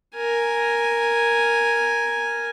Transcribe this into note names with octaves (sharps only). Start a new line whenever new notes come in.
A#4 G#5